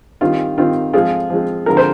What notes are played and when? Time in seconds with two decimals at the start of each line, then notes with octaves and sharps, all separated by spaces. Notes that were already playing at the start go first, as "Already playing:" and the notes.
0.21 D#3 G3 C4 F4
0.58 D#3 G3 C4 F4
0.93 F3 G#3 C4 F4 G#4
1.30 F3 G#3 C4
1.66 D3 F3 G#3 C4 A#4
1.77 C5